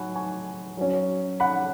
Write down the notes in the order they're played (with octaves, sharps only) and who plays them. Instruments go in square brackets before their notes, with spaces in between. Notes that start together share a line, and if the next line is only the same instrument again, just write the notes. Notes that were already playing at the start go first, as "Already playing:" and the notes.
Already playing: [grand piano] F#3 D#4 F#5 G#5 B5 C#6
G#5 C#6
F#3 C#4
F#5 B5